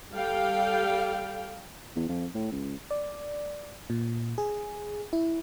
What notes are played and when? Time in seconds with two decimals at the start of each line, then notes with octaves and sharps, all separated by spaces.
0.12 G3 A4 F5 G5
1.96 E2
2.09 F2
2.35 A2
2.52 C#2
2.91 D5
3.90 A#2
4.38 G#4
5.13 E4